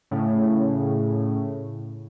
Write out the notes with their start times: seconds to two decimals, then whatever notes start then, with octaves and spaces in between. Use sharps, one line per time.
0.11 A2 C#3